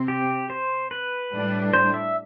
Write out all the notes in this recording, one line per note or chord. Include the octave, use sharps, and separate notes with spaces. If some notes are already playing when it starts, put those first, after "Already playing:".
Already playing: C3 C4
G4
C5
B4
A2 G3 D4
C5
E5